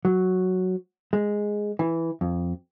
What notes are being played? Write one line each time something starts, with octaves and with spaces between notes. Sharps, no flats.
F#3
G#3
E3
F2